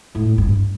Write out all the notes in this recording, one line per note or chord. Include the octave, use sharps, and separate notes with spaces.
A2
G2